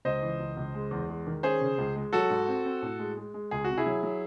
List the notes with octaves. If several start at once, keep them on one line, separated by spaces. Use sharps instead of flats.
C#2 C5 D#5
E3
C#2
C#2
G#3
E2
G#3
D#3
C#4 G#4 C5
C#3
C#2
G#3
F#3 F#4 A4
G#2
C4
C4
A2
G#3
G#3
G#3
C#2 G#4
C3 F#4
E4 G#4
F#3
F#3